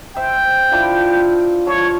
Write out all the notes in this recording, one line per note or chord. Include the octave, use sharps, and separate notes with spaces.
C5 E5 G5
D4 E4 F4
F3 C#5 F5 E6